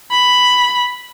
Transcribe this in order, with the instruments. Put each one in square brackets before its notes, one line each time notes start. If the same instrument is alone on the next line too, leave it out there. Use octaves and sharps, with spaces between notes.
[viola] B5